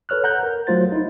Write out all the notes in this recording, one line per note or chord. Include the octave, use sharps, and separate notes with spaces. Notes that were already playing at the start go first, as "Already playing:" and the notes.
A4 B4 C#5 F6 F#6
F#5 A#5 F#6 G6
A#4
F#3 A3 F4 C5 A6
D#4 E4